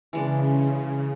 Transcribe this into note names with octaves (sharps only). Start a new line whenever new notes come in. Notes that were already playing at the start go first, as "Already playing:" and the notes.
C#3 E3 G#3 D4